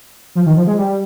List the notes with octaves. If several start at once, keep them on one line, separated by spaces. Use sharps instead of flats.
F3
D#3
F3
G#3
G3